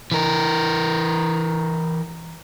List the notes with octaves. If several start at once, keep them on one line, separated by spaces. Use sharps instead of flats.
E3 A#4